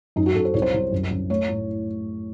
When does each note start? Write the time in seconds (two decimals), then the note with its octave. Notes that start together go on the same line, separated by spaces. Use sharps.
0.16 F#2 D#4
0.26 F#4
0.35 F#2 A4
0.45 C5
0.54 C2 C#5
0.62 C5
0.73 C2
0.92 F#2
1.11 F#2
1.30 A3 C#5
1.48 A2